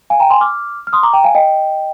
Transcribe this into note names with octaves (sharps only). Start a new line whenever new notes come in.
F5 G#5
G5 A#5
G#5 C6
D6 F6
F6
C6 D#6
A#5 D6
G5 A#5
F5 G#5
D#5 G5